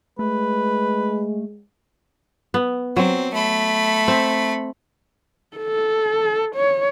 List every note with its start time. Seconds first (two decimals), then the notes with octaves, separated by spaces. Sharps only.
0.19 G#3 A3 B4
2.54 B3
2.97 F#3 C4
3.34 A3 B5
4.08 C4
5.57 A4
6.56 C#5